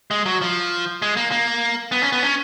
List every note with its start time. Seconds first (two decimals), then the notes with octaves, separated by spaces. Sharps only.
0.11 G#3
0.26 F#3
0.41 F3
1.02 G#3
1.17 A#3
1.31 A#3
1.92 B3
2.02 C#4
2.12 B3
2.23 C#4